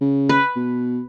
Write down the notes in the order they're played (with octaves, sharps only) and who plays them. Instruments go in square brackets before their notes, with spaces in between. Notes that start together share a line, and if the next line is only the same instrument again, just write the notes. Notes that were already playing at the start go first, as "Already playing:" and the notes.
[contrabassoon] C#3
[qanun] B4
[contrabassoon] B2